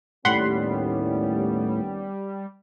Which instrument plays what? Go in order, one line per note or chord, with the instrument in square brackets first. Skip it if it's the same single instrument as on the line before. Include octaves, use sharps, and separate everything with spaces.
[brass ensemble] D#2 B3 C#4 [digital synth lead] A2 [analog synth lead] G3 [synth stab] F#5 B5 C6